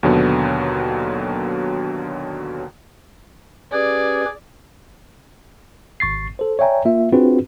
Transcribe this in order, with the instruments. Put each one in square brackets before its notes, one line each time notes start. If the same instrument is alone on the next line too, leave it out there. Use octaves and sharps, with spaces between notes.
[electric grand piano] D#2 B2 D3 F#3 B3
[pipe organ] C#4 G4 B4 [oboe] G#4 [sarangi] D5
[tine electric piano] G#1 C#6 A6 C7
A4 C5
C#5 D5 E5 G5 G#5 A#5
A#3 F4 E5
C4 D4 F4 F#4 G#4 B4